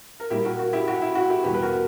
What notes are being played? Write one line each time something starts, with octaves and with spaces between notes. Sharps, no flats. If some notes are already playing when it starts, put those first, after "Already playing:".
A#4
A#2 G3 E4 G4
F#4 A#4
F#4
E4 G4
F#4
E4
F#4
E4 G4
E2 B2 G3 G4 B4
B4
F#4 A#4